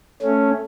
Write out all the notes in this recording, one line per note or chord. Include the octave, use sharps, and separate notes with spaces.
A3 C#4